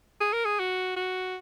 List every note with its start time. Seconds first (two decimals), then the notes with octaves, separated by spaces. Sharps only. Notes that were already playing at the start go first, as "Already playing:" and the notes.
0.21 G#4
0.33 A#4
0.45 G#4
0.59 F#4
0.97 F#4